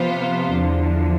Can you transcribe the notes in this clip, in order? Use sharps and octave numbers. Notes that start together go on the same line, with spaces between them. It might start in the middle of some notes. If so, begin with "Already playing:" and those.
Already playing: C3 F3 B3 F4 C5
E2 D3 F3